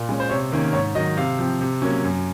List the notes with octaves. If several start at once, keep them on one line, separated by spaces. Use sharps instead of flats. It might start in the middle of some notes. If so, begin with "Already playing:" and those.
Already playing: A#2
G#3 C#4
C5
C3 C#5
D#3 A#3 C#4
G#2 C#5
D#3 F#3 D#5
C3 F5
F3 C4
C3
F#3 A#3 C#4
F#2